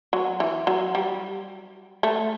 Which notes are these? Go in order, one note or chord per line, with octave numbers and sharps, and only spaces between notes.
F#3
E3
F#3
G3
A3